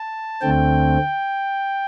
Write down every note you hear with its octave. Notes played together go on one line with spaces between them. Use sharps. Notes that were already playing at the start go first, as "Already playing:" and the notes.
Already playing: A5
D2 D3 A3 C4 G5